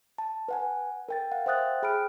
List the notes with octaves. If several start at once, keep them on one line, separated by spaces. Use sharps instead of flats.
A5
B4 F#5 G#5
A#4 G5 A6
F5 F#5
C5 E5 G5 D#6 F#6 A6
G#4 G5 B5 F6 D7